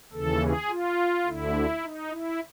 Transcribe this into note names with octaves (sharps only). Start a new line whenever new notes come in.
D#2 C#3 E3 A4
G#4
F4
D2 D3 E4
D#4
E4